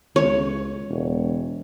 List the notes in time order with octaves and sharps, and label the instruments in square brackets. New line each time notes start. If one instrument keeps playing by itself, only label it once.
[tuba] C#2 [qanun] C#5
[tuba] E1